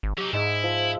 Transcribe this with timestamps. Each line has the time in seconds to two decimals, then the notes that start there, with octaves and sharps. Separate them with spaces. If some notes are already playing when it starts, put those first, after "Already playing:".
0.03 G#1
0.18 F#3 D#4 G4
0.33 G#2 G#3 E4 D#6
0.63 F3